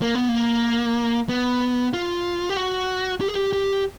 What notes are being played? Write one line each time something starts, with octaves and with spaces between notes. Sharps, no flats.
A#3
B3
A#3
B3
F4
G4
F#4
G4
G#4
G4
G4